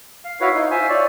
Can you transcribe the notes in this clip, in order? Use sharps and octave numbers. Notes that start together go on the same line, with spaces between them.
F5
E4 F#4 B4 C#5 F5
D#4
F4 C5 E5 G#5
C#5 D5